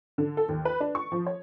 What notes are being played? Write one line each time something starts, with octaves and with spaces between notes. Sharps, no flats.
D3
A4
D#2
B4
D4
C#6
F3
C#5